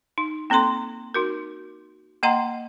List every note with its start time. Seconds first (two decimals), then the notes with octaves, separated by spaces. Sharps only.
0.18 D#4
0.50 A#3 C4 A4 A#5 C6
1.14 D#4 F#4 A#4
2.23 A#3 D#5 F#5 A#5 C6